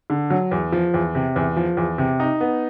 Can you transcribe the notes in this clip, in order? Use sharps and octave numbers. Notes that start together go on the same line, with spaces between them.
D3
F#3
E2
F3
E2
C3
E2
F3
E2
C3
D#4
B3